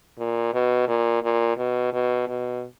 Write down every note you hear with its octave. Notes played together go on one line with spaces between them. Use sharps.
A#2
B2
A#2
A#2
B2
B2
B2